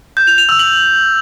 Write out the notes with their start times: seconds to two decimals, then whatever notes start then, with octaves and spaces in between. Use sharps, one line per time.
0.17 G6
0.27 F7
0.38 F7
0.49 E6
0.59 F#7